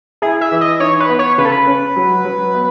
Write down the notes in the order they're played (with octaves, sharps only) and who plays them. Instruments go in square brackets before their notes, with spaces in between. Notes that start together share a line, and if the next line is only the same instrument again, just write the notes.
[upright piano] E4 [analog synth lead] G#4
[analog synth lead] E5
[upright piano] E3
[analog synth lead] D#5
[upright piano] D#4 [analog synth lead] C#5
[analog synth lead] B4
[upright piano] B3
[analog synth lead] C#5
[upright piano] C#3 [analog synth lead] B4
[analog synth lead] A4
B4
[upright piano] C#4
F#3
F#3
B3